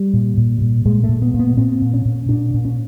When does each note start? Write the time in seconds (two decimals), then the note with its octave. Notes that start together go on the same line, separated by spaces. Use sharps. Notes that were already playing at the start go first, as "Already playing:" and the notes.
Already playing: G3
0.14 A#2
0.37 A#2
0.61 A#2
0.85 A#2 G#3
1.04 A3
1.09 A#2
1.22 B3
1.34 A#2
1.39 B3
1.57 A#2 C4
1.82 A#2
1.94 C#4
2.05 A#2
2.29 A#2 D4
2.54 A#2
2.65 C#4